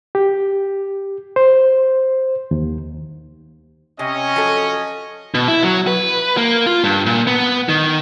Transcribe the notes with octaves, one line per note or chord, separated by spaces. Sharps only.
G4
C5
D#2
C3 C#4 D#5
F3 F#3 A4
B2
E4
F#3
B4
A#3
F4
G2
A#2
B3
D#3